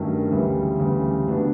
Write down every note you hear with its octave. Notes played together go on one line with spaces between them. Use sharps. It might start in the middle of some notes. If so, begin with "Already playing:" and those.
Already playing: G2 D#3 F#3 A3 C#4
D2 C#3 E3 G3
D2 C#3 E3 G3
A2 F#3 B3 D4